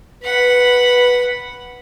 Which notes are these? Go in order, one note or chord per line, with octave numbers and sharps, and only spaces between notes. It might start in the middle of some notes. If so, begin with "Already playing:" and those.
B4 F#5 B5